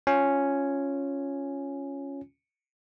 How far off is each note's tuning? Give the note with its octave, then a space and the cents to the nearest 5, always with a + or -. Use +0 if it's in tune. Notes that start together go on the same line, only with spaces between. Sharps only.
C#4 +0 F4 +0 G#5 +0